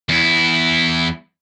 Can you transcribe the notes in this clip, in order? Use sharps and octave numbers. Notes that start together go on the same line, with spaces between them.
E2 E4